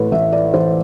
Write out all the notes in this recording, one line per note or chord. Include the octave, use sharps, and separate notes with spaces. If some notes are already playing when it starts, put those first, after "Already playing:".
Already playing: A1 A2 A4 B4
A1 E5
D5
E3 C5